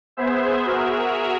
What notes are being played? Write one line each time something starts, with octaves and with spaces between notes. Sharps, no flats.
B3 G#4 C5 E5
F#4 G#4 A#4 E5